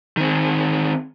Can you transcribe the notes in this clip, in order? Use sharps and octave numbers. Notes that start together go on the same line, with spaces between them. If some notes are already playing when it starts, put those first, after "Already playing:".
D#3 C4